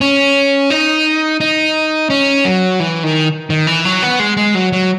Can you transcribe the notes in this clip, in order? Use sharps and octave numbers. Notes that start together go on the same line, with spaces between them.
C#4
D#4
D#4
C#4
F#3
E3
D#3
D#3
E3
F#3
B3
G#3
G#3
F#3
F#3